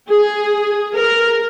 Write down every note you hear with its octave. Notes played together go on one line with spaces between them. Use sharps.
G#4
A#4